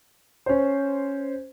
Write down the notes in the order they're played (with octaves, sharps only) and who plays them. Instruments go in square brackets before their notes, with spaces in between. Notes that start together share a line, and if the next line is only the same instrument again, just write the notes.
[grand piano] C#4 C5